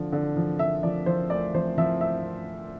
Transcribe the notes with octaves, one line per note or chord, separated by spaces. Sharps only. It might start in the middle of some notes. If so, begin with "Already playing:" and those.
Already playing: D3 F3
D3
F3
D3 E5
F3 D5
F3 C5
D2 D5
F3 C5
F3 E5
E5